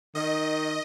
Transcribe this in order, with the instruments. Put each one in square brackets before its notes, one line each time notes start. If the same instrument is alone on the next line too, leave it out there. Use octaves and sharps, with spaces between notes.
[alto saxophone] D#3 [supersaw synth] D#5